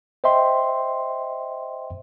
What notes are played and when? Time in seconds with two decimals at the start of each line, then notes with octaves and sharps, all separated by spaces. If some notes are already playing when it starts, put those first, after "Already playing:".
0.24 C5 D#5 E5 G5 C6